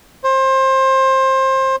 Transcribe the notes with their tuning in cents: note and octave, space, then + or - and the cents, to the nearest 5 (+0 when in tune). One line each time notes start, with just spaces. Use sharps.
C5 +25